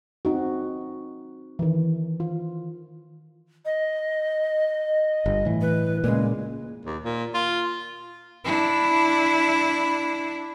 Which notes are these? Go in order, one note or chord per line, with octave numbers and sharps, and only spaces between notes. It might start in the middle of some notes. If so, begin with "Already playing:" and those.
C4 D#4 F#4
D#3 E3
F4
D#5
G1
A2 E3
B4
A#2 C#3 G#3
D#2
A#2
F4
D4 E4